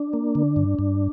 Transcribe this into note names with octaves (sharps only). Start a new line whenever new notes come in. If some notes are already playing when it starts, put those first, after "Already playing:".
Already playing: D4
A#3
D3
G2
G2